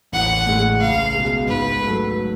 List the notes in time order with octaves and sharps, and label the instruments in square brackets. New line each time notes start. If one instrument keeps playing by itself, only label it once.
[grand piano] A1 [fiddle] F#5
[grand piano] A2 G#3
[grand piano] C#2 [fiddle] F5
[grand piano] B2 G#3
[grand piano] G#2 [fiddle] B4
[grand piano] F#3 A3